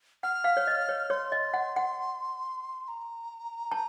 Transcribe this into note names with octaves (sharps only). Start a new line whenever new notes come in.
F#5 F6
F5
C#5
D#5
C#5
C#5 C6
D#5
F#5
F#5
C6
A#5
A5